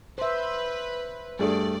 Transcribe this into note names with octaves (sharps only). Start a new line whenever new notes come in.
B4 C5 E5
G2 A3 G#4 D5